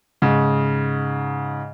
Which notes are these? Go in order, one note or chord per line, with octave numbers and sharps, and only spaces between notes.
G#2 C#3